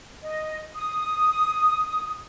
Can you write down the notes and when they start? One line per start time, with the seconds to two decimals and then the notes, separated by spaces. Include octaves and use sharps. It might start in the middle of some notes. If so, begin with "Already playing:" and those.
0.22 D#5
0.75 D#6